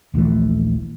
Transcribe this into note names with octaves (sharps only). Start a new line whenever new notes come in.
D#1 A#1 E3 A3